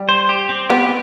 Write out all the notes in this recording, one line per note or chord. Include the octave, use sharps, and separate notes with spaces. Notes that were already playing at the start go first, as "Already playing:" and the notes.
Already playing: G3
C5
G4
C4
B3 G4